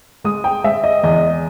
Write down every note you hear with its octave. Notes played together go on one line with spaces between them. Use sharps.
G#3 D#6
G5
G#3 E5
D#5
E2 D#5